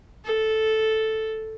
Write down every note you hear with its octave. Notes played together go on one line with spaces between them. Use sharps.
A4